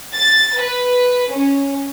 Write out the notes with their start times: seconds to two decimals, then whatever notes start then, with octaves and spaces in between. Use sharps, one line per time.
0.16 A6
0.60 B4
1.32 C#4